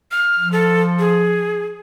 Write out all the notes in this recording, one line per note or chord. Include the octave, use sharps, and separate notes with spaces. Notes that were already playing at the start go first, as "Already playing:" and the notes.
F6
F3
A4
G#4